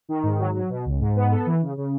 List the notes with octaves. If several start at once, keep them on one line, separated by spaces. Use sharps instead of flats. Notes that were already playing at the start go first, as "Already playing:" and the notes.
D#3
G#2
F#3
F#3
B2
C#2
G#2
B3
A4
E3
C#3
C#3